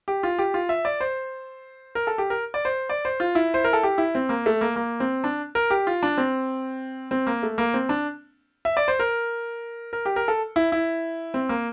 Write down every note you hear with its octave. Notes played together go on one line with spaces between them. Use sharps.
G4
F4
G4
F4
E5
D5
C5
A#4
A4
G4
A#4
D5
C5
D5
C5
F4
E4
C5
A#4
A4
G4
E4
C4
A#3
A3
A#3
A#3
C4
D4
A#4
G4
F4
D4
C4
C4
A#3
A3
A#3
C4
D4
E5
D5
C5
A#4
A#4
G4
A#4
A4
E4
E4
C4
A#3